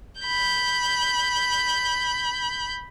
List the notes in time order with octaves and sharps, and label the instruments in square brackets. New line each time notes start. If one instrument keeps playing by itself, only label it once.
[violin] B5 G6